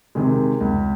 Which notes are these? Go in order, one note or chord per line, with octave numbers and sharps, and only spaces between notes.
C3 D#3 G#3
C#2